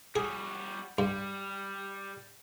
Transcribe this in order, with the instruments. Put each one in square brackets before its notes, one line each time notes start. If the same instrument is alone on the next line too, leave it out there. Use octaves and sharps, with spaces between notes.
[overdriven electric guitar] G3 F#4 [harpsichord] G#4
[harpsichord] G2 [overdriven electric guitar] G3